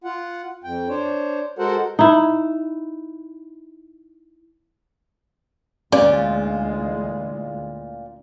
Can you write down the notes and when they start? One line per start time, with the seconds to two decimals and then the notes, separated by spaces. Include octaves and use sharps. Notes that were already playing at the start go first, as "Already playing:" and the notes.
0.04 F4 F#5
0.64 F2 G5
0.89 D4 C5 C#5
1.59 G#3 F#4 A4 A#4 C5 F#5
1.99 D#4 E4
5.92 D2 A#2 E3 G#3 C#4 F4 D5